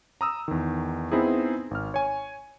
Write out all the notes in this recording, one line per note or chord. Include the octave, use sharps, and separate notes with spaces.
A#5 D#6 E6
E2 D#3
B3 C4 D#4 E4 G#4
G#1 F6
C#5 G#5